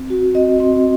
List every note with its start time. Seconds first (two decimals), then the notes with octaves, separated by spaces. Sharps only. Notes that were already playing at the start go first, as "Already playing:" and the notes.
Already playing: C4
0.10 F#4
0.34 C4 D#5
0.60 C4